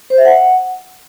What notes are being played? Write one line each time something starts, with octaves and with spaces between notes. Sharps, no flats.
C5
E5
F#5